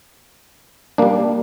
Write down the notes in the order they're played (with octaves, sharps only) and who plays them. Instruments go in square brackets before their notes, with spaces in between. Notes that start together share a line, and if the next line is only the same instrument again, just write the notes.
[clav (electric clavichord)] G3 A#3 D4